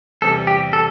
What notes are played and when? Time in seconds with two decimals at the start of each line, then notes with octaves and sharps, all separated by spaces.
0.22 E2 C3 G3 A4
0.47 G4
0.73 A4